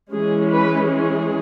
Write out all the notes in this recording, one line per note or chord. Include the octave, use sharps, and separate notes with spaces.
E3 G#3 C#4 G#4
B4
G#4